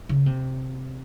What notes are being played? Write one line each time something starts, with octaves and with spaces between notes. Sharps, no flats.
C#3
C3